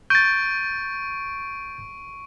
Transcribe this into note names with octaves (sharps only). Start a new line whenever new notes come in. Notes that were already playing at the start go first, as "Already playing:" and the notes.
C#6 G6 A6 D7